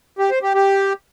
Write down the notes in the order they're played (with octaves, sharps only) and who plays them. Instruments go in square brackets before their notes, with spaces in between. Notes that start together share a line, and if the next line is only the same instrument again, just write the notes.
[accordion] G4
C5
G4
G4